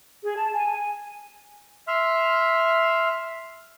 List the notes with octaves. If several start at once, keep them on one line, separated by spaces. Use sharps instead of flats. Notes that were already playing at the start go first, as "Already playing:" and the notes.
G#4
A5
G#5
E5 C6 F6